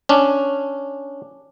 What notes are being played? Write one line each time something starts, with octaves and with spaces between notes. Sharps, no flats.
C#4 D4